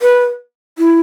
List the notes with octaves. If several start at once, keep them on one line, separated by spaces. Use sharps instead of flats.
B4
E4